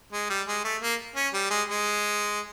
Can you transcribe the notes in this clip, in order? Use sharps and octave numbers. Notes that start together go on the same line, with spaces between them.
G#3
G3
G#3
A3
A#3
C#4
G3
G#3
G#3